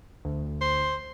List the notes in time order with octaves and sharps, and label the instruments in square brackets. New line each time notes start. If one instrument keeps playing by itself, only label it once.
[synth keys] D2
[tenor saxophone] C5